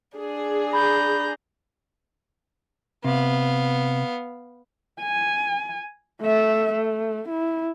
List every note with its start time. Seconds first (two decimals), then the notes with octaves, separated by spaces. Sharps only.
0.17 D4 G#4
0.73 A#5 B5 G6
3.04 C3 B3 F5
5.02 G#5
6.21 A3 E5
6.73 A3
7.29 E4